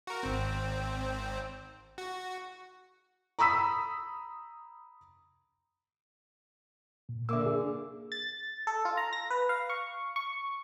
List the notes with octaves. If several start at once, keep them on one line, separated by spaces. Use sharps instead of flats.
F#4 A#4
G#1 C4
F#4
A#5 B5 D#6 E6 B6
A#2
D3 A#3 E5 D6 E6
D4 G#4
A6
A4
F4
A#5
A#6
B4
F5
C#6
C#6